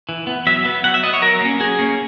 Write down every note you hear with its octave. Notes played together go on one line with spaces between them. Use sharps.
E3
B3
F#3 E5
B3
F#3 F#5
E5
B3 D#5
C#5
F#3 A#4
A#3 C#4
F#3 G#4
A#3 C#4